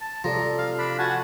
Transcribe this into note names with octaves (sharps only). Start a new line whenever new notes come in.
A5
C3 F3 A4 D5 A#5
F5
D4 B5
F#4 F#5 G#5 A5